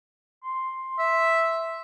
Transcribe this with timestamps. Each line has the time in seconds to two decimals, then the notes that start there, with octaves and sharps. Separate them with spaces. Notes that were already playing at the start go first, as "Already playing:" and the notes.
0.43 C6
0.99 E5